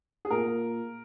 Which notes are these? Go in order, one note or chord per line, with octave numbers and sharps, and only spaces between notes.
G#4
A#2 A#3 A#4